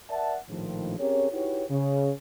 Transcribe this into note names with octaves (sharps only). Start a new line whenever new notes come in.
A#4 D5 E5 F#5 A5
A#1 A2 D#3 F3
C4 C#4 G4 G#4 A#4 C#5
D#4 E4 F#4 G4 B4 C#5
C#3